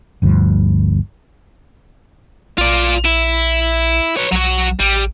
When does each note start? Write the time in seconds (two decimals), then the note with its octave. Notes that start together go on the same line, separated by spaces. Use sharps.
0.22 G1 D2 G2 F3
2.58 A#1 F4 D5
3.05 E4
4.17 B4 C#5
4.32 B1 F#3 F#4
4.80 A1 G3